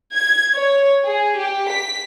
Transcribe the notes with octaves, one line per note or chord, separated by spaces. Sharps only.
G#6
C#5
G#4
G4
B6